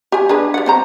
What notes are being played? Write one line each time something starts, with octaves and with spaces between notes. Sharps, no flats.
G4 G#5
D4 G#4 B4
G3 F#5
C4 C5 A#5